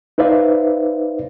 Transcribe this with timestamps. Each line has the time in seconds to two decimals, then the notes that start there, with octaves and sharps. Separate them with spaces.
0.18 D#4 B4 C5 D5 E5 F5